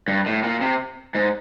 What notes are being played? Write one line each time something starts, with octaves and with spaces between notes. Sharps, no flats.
G2
A2
A#2
C3
G#2